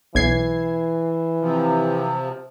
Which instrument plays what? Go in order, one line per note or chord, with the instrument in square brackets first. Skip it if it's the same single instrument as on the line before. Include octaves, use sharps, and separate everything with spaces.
[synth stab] B1 G#6 C7 [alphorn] E3
[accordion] C3 F3